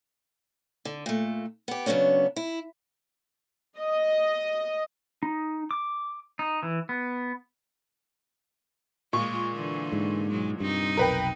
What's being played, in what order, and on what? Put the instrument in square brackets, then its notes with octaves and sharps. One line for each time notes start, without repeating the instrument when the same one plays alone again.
[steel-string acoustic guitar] D3
A#2 A3
B3 G4
C#3 F#3 A3 B3 C#4 D4
E4
[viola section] D#5
[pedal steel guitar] D#4
D6
D#4
E3
B3
[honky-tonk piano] A#2 C#6 [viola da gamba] G#3 F4
[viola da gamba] D3 E3 F4
[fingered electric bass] G#2
[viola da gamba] B2 F#3 G#3
[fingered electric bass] G2 [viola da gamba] C3 C4 D#4
[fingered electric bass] F1 B1 [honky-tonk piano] A#4 B4 G5